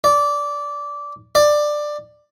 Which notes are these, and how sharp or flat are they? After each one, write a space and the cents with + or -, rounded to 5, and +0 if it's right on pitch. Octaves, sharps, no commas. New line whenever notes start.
D5 -15
D5 +15